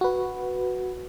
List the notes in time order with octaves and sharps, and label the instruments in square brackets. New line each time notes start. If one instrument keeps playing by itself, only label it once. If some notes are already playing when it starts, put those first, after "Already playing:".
[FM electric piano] F#4 B4